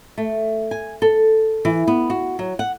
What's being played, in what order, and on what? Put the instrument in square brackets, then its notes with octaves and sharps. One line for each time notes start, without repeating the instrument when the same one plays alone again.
[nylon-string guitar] A3
G#5
A4
E3
B3
F#4
F#3
F#5